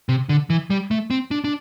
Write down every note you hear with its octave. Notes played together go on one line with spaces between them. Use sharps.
C3
D3
E3
G3
A3
C4
D4
D4